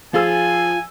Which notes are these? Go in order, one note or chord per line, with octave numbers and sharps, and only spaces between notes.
F3 F4 G#4 G#5 E6